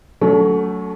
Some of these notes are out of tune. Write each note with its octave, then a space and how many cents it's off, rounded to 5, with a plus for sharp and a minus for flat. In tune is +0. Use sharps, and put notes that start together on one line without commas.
F#3 +5 A3 +0 C#4 +45